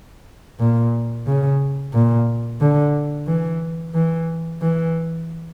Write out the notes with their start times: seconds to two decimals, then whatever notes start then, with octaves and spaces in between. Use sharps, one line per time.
0.60 A#2
1.27 C#3
1.94 A#2
2.61 D3
3.27 E3
3.95 E3
4.62 E3